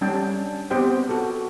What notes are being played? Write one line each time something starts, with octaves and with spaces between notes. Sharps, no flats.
G3 C#4 D4 G5 A5
B3 C4 G4 C5 D#5 G5
F#4 A4